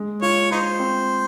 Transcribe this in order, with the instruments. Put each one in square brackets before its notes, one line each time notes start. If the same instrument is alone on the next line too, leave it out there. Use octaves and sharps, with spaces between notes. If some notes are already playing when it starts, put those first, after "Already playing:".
Already playing: [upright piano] G#3
[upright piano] F4 [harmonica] C#5
[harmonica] D#4 C5 [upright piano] F4
[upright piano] C4